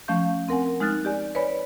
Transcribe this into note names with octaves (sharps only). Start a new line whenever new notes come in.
F3 A3 C#4 F5 C#6 G6
C4 A#4 F#5 G#5
G#3 D#4 F6 F#6 A6
G4 D5 G#5
B4 C#5 D5 G#5 B5